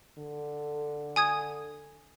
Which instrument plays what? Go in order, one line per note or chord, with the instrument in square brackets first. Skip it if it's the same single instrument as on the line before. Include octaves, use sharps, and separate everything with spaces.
[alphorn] D3
[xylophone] G#5 D#6 G#6